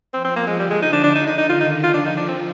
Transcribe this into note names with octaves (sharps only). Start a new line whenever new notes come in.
F3 C4
C4
A#3
G#3
D3 G3
G#3
D#4
D4
D3 D4
D#4
D#4
D#4
D#3 F4
D#4
F4
F3 D4
D#4
D4
C4